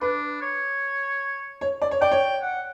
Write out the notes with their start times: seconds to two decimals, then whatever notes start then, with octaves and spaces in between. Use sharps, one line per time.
0.01 D4 B4
0.42 C#5
1.61 C#5
1.82 D5
1.91 C#5
2.01 D5 G5
2.12 C#5
2.42 F#5